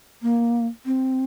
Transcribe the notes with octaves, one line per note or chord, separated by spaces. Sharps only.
A#3
C4